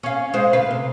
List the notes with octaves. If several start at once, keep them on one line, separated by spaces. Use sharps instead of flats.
C#4 F5
G#3 C5 F5
D2 B4 F5
C3